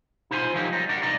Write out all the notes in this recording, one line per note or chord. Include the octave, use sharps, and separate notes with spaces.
D#4 F4 C5 E5 G#5 C6
F3 F#3 A#3 D#4 G4
G3 D#4
D4 F#4 A#4
C2 D#4 D5 D#5 A#5